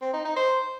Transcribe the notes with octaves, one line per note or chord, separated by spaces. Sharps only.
C4
D#4
D#4
C5